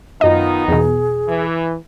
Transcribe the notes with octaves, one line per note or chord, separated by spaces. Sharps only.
F#2 D#3 B3 D#4 F4 D#5
E2 B2 G#4
E3